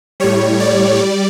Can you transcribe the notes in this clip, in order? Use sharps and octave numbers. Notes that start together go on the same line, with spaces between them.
A2 G3 C#5
D5
G3